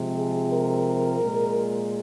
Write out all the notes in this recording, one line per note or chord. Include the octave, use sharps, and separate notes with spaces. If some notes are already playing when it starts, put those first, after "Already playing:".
Already playing: C3 F3 G#3
G#4
A#4
A#2 G#3